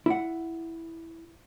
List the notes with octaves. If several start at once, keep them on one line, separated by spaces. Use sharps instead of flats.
E4 F#5